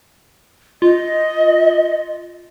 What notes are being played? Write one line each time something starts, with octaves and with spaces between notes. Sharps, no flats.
F4 D#5